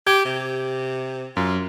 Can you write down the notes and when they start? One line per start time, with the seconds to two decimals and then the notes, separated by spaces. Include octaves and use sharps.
0.07 G4 G#6
0.25 C3
1.37 F#2 F4